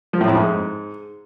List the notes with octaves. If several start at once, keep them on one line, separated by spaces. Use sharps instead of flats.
F3
A2
F2
G#2